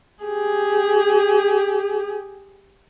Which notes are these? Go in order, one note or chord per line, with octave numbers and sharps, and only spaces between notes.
G4 G#4